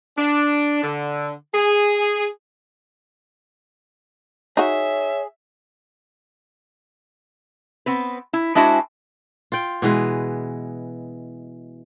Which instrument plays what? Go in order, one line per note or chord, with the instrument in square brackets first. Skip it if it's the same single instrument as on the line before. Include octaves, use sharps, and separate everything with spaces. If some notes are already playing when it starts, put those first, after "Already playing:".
[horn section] D4
D3
G#4
[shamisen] D#4 F#4 [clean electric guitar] G#4 [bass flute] C#5 [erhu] E5
[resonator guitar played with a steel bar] B3 C4 B4
E4
G#3 D4 E4 F#4 C5 G#5
[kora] F4 G5
B2 E3 G#3 B4